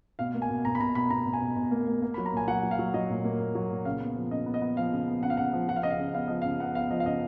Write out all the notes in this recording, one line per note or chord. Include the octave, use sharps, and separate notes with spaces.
B2 F5
A#3
G#5
B2
B2 A#5
B5
B2 A#5
B2 B5
B2 A#5
B2
G#5
B2
B2
A#3
A#3
A#3
F#3 B5
A#5
A#2 G#5
F#3 F#5
F#3
F5
F#3
F#3 D#5
A#2
A#3
A#2
F#3
A#2
C#3 F5
B3
F3
C#3 D#5
B3
D#5
B3
F3 F5
C#3
B3
C#3 F#5
F5
C#3 F#5
F3
F3 F#5
F5
C#3 D#5
F5
C#3
B3 F5
F3 D#5
F5
C#3
B3 F#5
B3 F5
F3 D#5
F5
C#3 D#5